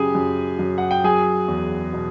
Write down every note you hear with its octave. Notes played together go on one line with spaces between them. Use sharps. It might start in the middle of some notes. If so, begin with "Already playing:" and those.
Already playing: F#2 C#3 G4 G#4 G#5
F#2
F#2
F#5
G5
F#3 G#4 G#5
E2
B2